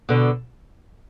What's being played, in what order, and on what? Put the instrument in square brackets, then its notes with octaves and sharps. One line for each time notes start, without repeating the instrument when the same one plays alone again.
[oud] B2 D3